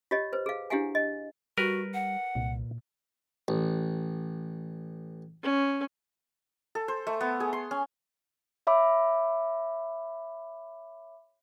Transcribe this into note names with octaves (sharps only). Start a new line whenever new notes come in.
F4 G4 C#5 D#5
B4 C5
G#4 F5
D4 E4 G4 F5 F#5 G#5
D#5
G3 F#4 A#4 B4
F#5
C2 A#2
A1
C#4
A4
C5
A3
B3
G#4
C6
C#4
C#5 E5 B5 D6